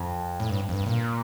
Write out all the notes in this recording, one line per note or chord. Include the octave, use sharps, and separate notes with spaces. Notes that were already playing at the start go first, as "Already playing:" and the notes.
Already playing: F2
A2
G2
F2
G2
A#2